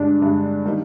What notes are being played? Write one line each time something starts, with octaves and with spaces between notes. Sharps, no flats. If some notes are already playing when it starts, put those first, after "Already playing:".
Already playing: G2 D3 G#3 D4
G2 D3 G#3
D#3 G3 A#3 D#4